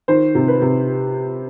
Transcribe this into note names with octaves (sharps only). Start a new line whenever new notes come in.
D#3 C5
C3
B4
C3